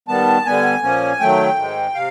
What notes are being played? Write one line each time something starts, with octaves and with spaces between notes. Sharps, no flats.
D#3 G3 B3 A5
D3 G3 B3 G#5
A#2 F3 A#3 C#4
D#3 F#3 A3 G5
G#2 D#3 G#3
C3 F5